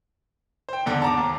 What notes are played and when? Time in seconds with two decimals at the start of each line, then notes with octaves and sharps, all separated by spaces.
0.69 C5 G5
0.86 E2 G#2 D3
1.02 A5 A#5 D6
1.17 D#2